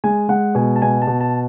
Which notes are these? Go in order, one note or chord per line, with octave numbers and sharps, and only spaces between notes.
G#3 G#5
G#3 F#5
B2 G#5
A5
B2 G#5
A5
B2
A5